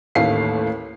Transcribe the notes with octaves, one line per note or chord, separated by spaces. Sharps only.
A1 D#2 A3 F5 C7